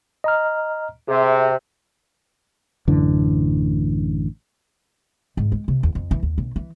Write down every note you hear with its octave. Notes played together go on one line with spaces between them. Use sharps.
D#5 A#5 F6
C3 G#4 E5
A1 F#2 D3 E3
G#2
G#3
C3
E2
F2
E3
D#2
B1
E3